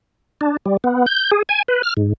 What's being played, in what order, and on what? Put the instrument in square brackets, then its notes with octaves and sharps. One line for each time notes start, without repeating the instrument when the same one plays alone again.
[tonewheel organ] D4
G3
B3
G6
G#4
G#5
B4
F6
G#2